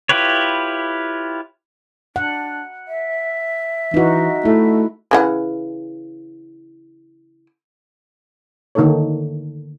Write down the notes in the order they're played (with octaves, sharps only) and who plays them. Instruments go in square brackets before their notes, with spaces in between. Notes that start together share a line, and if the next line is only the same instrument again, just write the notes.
[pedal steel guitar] E4 F4 G4 B4 C#5
[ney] D4 [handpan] F#5
[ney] E5
[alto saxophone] E3 [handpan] D#4 F#4
[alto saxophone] A3 [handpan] E4
[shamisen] C#3 E3 F#5
[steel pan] D3 D#3 A#3 D#4 A4 C#5